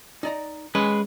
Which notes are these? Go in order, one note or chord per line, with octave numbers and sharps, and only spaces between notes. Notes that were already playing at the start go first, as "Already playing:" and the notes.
D#4 D5 A#5
G#3 C#4 B4